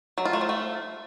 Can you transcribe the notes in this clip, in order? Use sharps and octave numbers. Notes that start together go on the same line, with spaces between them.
F#3
F4
A3
F3
A3